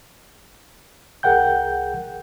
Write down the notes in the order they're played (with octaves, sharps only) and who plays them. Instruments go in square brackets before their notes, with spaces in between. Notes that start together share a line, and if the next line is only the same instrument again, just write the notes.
[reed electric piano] C2 G#4 A#4 F#5 G5 G6